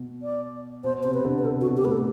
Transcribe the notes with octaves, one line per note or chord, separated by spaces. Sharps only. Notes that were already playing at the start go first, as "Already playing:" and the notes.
Already playing: B2
D5
B2 C5
C3 C5
B4
C3
D3
B4
C3 A4
F#4
B2
G4
A2 B4
A4